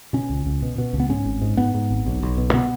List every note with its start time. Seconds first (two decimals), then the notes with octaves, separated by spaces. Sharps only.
0.13 B2 C#4
0.30 C#2
0.46 C#2
0.62 B2
0.78 B2
0.93 C#2
1.00 B3
1.09 G#2 C#4
1.25 G#1
1.42 G#2
1.57 G#2 B3
1.74 G#2
1.90 G#1
2.06 B1
2.23 B1
2.38 B2
2.50 A3
2.53 B2 B3